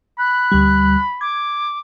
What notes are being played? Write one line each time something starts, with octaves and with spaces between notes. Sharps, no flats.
B5 F#6
D2 G3
D6 G#6